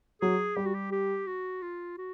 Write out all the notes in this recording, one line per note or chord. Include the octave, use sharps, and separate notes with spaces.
F#3 G#4
G3 G4
F#4
G4
G4
F#4
F4
F#4